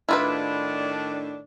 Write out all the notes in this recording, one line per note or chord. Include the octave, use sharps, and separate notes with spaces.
A2 D#3 D4 E4 F4 B4